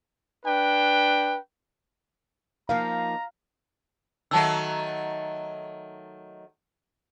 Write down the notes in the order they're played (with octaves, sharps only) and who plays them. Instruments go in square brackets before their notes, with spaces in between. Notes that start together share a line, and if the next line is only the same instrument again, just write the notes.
[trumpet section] D4 B4 G5
[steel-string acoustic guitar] F3 A#3 D#4 [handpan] F5 [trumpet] A#5
[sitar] D#3 F#3 A3 [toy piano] F#5 A5 E6